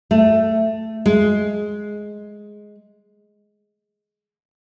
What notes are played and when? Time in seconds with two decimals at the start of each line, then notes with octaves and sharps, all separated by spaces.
0.11 A3
1.06 G#3